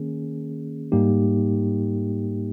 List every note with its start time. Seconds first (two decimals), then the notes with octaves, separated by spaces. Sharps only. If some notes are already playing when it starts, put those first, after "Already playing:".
Already playing: D#3 A#3 C#4 G#4
0.92 G#2 G3 A#3 D#4 G4